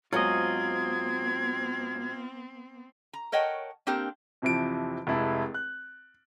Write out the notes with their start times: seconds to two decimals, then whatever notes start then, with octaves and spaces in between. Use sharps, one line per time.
0.13 G#2 F#3 B3 C4 F4 D#5 G#6
3.13 A#5
3.32 A#4 C#5 D#5 F#5 G5 A5
3.87 A#3 C4 D4 G4 A#4
4.42 F2 C3 E3 F3 D7
5.07 F1 G#3 E4 A5
5.54 F#6